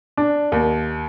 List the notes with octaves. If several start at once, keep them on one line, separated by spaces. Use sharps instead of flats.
D4
D#2